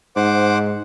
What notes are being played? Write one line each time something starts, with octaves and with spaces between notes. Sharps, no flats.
G#2 C5 F#5 D6